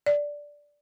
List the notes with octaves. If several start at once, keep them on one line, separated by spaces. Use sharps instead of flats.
D5